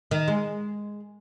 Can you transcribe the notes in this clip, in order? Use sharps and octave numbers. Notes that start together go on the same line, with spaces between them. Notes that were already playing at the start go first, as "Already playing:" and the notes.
D#3
G#3